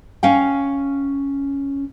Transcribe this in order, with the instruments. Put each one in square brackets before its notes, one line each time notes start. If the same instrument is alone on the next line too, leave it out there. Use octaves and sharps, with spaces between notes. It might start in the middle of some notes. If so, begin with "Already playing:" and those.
[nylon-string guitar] C#4 F5 G5